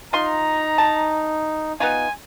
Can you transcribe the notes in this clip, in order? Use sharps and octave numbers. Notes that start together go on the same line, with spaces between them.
D#4 F4 A#5 C6
A5
B3 D#4 F4 G#5